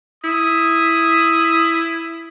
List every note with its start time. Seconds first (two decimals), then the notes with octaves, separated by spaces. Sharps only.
0.24 E4 D#6